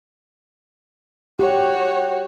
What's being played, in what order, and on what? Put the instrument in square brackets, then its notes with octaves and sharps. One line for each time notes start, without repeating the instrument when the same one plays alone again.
[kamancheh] F#4 C#5 [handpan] G4